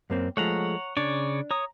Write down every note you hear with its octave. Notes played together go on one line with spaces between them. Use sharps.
F#2 A#3 C4
F3 G#3 A3 C#5 F#5 A#5
C#3 D4 C#5 D5
C#5 A#5 D#6